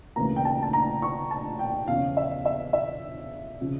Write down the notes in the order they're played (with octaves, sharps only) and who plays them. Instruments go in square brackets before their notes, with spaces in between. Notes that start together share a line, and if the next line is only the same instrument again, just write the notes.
[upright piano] D2 C#3 E3 A#3 A#5
G5
A5
A5
A#5
C#6
A5
G5
E2 C#3 F3 C#4 F5
E5
E5
E5
C#3 F3